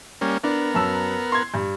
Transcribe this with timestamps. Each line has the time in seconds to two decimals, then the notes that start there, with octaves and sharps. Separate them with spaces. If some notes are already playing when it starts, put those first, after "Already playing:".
0.21 G3 A#3 C#4
0.44 B3 D4 A#4
0.74 F#2 A5 E6
1.32 C6 G#6
1.54 G2